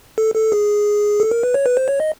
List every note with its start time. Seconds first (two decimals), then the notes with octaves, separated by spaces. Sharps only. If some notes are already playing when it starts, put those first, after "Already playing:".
0.18 A4
0.35 A4
0.52 G#4
1.20 A4
1.31 A#4
1.43 B4
1.54 C#5
1.66 B4
1.77 C5
1.88 C#5
2.00 D#5